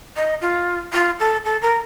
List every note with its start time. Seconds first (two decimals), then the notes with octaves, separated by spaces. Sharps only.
0.16 D#5
0.41 F4
0.93 F4
1.19 A4
1.45 A4
1.62 A#4